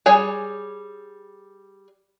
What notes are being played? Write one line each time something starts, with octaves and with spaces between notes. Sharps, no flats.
G3 G#4 C#5 G#5